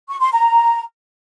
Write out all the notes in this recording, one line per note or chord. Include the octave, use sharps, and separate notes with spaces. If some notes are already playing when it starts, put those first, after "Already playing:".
C#6
C6
A#5